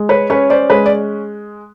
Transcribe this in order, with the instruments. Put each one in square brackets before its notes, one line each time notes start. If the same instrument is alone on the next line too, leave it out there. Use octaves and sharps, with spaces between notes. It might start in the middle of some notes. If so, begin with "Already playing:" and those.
Already playing: [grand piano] G#3
[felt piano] B4 C#5
[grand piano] C#4 [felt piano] B4 C#5
[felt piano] C5 D5
[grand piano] G#3 [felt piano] B4 C#5
[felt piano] D5